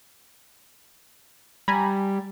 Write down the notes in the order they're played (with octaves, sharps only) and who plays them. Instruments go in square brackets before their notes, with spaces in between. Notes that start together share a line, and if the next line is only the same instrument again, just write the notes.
[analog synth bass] G3 [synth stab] G#5 A#5 B5